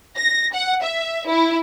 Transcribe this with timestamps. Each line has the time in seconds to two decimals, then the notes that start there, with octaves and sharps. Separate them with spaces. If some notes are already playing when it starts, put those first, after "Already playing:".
0.18 A#6
0.54 F#5
0.83 E5
1.28 E4